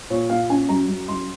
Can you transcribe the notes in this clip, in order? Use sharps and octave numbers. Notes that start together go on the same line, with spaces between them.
A#2 C#5
A#2 F5
C#4 G#5
F#2 A#5
F#2
F#2 C6